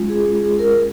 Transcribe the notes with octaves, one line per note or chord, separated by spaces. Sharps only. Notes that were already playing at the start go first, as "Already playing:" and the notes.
Already playing: G#3 C#4 F4
G#4
G#4
A#4